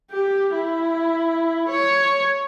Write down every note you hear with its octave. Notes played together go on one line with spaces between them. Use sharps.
G4
E4
C#5